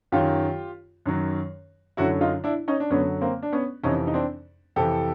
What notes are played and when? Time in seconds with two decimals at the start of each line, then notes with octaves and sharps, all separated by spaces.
0.12 F#2 D#3 F#3 F4 G4
1.06 F#2 D#3 F#3
1.97 F#2 D3 F#3 E4 F#4
2.21 D#4 F4
2.44 D4 E4
2.68 C#4 D#4
2.80 D4
2.90 F#2 D3 F#3 B3 C#4
3.21 A#3 C4
3.43 D4
3.53 B3 C#4
3.83 F2 C3 E3 C#4 D#4
4.07 D#4
4.14 C4 D4
4.76 F2 C3 E3 G4 A4